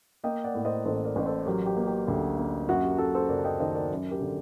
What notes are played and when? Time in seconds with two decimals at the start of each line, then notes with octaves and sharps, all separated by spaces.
0.24 A#3 D#5 G5
0.44 D5 F#5
0.55 A2
0.65 C5 D#5
0.85 A1 A4 C5
1.05 A#4 D5
1.16 A1
1.26 A4 C5
1.46 F#3 G4 A#4
1.66 G4
1.77 A#3
1.87 G4
2.08 D2
2.38 A#3
2.68 F#2 F#4
2.83 G4
2.98 F#2 F#4 A4
3.14 A4 C5
3.29 F#1 A#4 D5
3.39 A5
3.45 D#5 G5
3.60 D#3 C5 D#5
3.75 A#4 D5
3.90 F#2
4.11 G4 A#4
4.21 D3